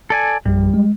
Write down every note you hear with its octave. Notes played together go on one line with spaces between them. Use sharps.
A4 D5 G#5
A#1 F#2 G3
G#3